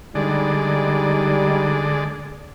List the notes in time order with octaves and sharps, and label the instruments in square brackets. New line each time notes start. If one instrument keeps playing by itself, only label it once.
[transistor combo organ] D3 G#3 D5 [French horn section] G3 D#4